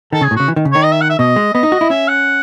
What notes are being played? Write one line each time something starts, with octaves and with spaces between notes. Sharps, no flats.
D#3 A4
C#3 G#4
A2
C#3 F#4
E3
D#3
C#3
D#3 C#5
D#5
E5
F#5
E5
B2 D#5
G#3
B3 D#5
D#4
F#4
E4
C#4 E5
F#5